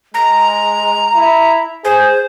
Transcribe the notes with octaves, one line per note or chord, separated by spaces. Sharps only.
G#3 A#5
E4
G#4 C5